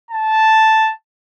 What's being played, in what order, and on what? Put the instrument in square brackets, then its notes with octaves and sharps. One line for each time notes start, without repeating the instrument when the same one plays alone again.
[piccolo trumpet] A5